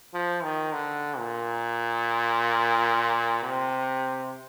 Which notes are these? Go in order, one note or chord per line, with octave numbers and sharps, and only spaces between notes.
F3
D#3
D3
A#2
C3